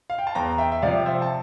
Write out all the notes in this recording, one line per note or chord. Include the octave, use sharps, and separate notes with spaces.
F5
G5
A5
E2 G5 A#5
E5 G5
E5
C3 F3 D5 F5
C5 E5
A5